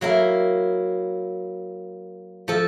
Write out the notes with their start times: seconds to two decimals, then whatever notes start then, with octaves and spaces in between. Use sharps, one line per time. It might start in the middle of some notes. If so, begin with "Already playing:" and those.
0.01 F#3 A#3 E4 A#4
2.48 F3 A4